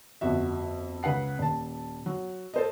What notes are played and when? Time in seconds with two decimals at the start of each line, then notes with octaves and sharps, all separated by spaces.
0.21 G1 F2 F#4 E5
1.03 C#2 C#3 B4 F#5 C7
1.39 D#1 A5
2.06 F#3
2.54 A4 C5 D#5